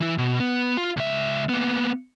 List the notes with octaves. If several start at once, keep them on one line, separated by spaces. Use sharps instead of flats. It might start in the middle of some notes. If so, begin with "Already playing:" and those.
E3 E4
B2
B3
F4
C#2 E5
A#3 B3